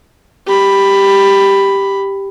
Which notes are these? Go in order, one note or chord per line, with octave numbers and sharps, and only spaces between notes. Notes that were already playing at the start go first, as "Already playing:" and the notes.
G4 B5